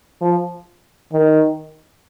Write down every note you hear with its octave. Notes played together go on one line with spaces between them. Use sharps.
F3
D#3